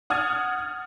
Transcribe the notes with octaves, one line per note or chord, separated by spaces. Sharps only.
F#5 D#6 F6 G#6 A6 D#7